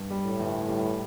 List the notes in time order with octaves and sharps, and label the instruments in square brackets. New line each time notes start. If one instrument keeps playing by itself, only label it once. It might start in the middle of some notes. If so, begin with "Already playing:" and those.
Already playing: [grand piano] G2
G3
[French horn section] A2
[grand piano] G1
G3